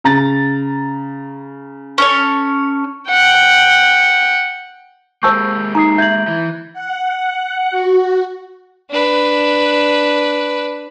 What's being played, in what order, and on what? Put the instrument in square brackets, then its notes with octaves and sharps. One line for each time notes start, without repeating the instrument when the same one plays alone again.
[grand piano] C#3 A#5 A6
[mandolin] C#4 A4 C#5
[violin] F#5 G5
[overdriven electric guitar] G#3 A#3 [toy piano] C5 A5 C#6 [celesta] E6 G6
[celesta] D#4 C7 [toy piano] A#5 D#6
[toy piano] E5 [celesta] G6 G#6 F#7
[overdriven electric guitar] E3
[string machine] F#5
F#4
[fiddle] D4 B4